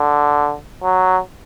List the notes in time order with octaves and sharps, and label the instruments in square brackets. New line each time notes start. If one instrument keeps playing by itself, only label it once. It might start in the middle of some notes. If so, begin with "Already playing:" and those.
Already playing: [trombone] D3
F#3